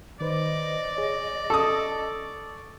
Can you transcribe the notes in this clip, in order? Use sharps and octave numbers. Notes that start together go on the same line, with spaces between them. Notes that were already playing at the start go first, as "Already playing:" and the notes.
D#3 B4 C5 D5 D#5
G#4 C#5
A4 C#6 D#6